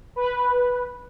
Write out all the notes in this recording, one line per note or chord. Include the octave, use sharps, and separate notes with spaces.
B4